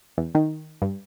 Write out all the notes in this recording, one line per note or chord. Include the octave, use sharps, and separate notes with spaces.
E2
D#3
G2